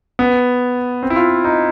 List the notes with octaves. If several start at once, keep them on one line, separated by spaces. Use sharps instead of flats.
B3
C4
E4
F4
D#4